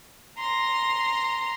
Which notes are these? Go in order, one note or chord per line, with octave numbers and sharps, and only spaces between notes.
A#5 C6